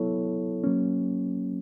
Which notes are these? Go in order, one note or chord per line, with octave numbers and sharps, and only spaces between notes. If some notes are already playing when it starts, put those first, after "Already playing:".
Already playing: F#3 B3 E4 A4 C#5
F#3 A#3 C#4